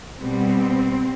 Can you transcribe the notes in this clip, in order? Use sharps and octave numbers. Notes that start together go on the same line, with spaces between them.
B2 G3 B3 C4